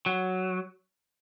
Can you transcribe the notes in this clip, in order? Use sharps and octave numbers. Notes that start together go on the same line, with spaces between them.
F#3